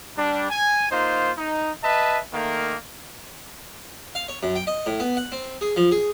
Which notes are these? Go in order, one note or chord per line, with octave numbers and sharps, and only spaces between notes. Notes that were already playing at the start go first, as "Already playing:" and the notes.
G3 D4
G#5
A#3 D#4 F4 C5
D#4
B4 D#5 E5 A5
D#3 A3 A#3
F5
C#5
F#2
G5
D#5
A2
B3
F#5
C4
G#4
F3
G#4